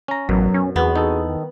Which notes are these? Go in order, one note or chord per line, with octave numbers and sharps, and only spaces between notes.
C#4 A#5
A1 F#2 B2 F#3
C#4
E2 B3 C4 F#4 G#4
D#4 A4
D#3